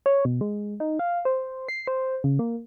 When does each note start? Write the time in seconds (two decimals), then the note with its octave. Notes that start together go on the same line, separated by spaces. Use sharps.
0.06 C#5
0.25 B2
0.41 G#3
0.80 D#4
0.99 F5
1.25 C5
1.69 C7
1.88 C5
2.24 C#3
2.39 A#3